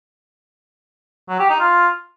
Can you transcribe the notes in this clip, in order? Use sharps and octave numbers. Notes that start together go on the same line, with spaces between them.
F#3
G4
D#4
F4